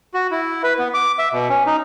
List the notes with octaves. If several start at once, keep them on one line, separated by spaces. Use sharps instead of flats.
F#4
E4
B4
B3
D6
E5
B2
C#4
D#4